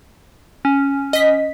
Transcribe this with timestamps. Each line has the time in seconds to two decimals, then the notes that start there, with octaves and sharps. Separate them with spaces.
0.65 C#4
1.13 D#5 B6